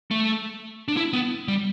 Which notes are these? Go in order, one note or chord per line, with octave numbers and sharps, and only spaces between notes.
A3
D4
E4
B3
G3